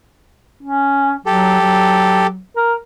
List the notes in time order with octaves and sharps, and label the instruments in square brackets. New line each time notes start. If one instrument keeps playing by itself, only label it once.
[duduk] C#4
[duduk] F#3 [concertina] G4 A4
[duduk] F#3
A#4